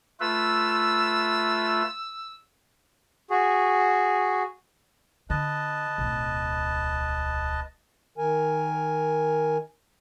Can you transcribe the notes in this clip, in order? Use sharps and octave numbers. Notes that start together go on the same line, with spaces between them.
A3 F4 B4 E6
F#4 G#4
D3 B4 D#5 A5
D1 B1
D#3 A#4 G#5